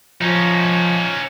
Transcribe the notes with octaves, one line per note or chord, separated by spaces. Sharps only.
F3 C#4 D#4